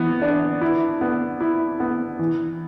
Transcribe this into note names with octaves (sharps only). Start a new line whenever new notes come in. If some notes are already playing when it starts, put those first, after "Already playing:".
Already playing: E3 B3
D4
E4
B3
E4
B3
E3